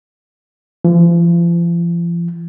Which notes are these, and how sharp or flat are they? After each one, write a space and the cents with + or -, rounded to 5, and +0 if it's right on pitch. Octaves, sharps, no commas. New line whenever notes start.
F3 -40